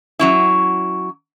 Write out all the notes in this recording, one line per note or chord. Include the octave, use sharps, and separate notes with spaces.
F#3 C#4 E4